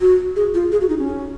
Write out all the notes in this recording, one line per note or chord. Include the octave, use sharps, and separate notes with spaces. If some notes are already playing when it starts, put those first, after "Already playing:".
F#4
G#4
F4
G#4
F#4
D#4
C#4